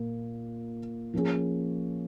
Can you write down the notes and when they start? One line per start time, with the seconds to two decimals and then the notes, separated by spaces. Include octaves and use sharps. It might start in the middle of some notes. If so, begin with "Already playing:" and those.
Already playing: A#2 A#3
1.14 F3 A#3 C#4 G#4